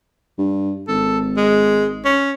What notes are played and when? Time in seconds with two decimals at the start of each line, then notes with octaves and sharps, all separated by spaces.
0.38 G2
0.88 G#1 A4
1.37 G#3
2.05 C#4